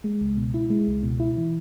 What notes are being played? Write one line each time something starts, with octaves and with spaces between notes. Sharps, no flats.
G#3
C#2
B2
E4
G#3
C#2
B2
E4
E3